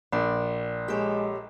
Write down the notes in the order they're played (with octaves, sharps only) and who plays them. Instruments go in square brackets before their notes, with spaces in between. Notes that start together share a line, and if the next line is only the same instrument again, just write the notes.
[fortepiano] A#1 [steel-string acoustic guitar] D5
[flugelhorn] G#3 [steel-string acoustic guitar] G4 A4 C#5